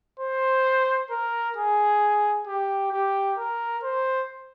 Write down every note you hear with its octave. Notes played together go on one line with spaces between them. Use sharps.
C5
A#4
G#4
G4
G4
A#4
C5